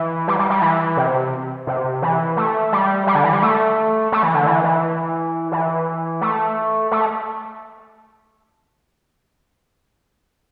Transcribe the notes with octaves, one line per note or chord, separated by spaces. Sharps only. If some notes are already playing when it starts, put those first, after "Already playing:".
Already playing: E3
G3
G3
G3
E3
C3
C3
E3
A3
G3
G3
D3
E3
G3
A3
A3
E3
D3
E3
E3
E3
A3
A3